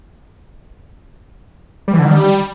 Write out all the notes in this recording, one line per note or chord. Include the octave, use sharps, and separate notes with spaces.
G3
E3
D3
D#3
G3